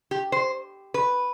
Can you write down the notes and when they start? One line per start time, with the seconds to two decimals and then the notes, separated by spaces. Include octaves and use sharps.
0.11 G4
0.32 C5
0.94 B4